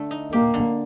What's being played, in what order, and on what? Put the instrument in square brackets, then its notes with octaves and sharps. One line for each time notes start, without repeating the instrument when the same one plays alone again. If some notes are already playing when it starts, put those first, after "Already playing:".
Already playing: [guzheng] D3 A3
D#4
[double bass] A#3 [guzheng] G4
[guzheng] D3